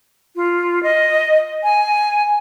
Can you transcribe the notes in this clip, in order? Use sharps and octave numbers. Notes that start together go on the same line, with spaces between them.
F4
D#5
G#5